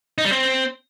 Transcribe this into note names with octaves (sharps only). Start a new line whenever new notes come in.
D#4
G3
C4